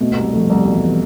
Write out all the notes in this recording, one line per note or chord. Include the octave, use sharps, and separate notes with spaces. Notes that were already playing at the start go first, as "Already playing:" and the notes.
B2 A3
C2 B3
G3
F3 A3
C2 G3
B2 G3
E3
E3